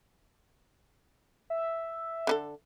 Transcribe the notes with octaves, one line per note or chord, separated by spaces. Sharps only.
E5
D3 D#4 A4